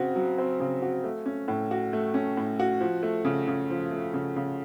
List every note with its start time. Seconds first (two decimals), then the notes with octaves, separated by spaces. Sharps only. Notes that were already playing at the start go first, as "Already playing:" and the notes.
Already playing: C#3 C4 F#4
0.16 F#3
0.38 C4
0.60 C#3
0.82 F#4
1.04 A3
1.26 C#4
1.48 A2
1.71 F#4
1.93 A3
2.14 C#4
2.37 A2
2.59 F#4
2.80 F3
3.03 A3
3.25 C#3
3.47 C#3
3.70 F3
3.91 A3
4.14 C#3
4.36 C#3